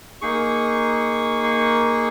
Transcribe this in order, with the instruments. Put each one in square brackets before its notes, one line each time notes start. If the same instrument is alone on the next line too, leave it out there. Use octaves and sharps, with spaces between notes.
[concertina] A#3 D#4 G#4 C#6
C#6